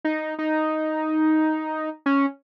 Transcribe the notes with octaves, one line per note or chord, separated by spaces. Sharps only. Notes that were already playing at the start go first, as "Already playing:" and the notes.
D#4
D#4
C#4